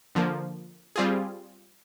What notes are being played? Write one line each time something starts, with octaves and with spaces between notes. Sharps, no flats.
D3 F3 A#3
G3 C4 F4 G#4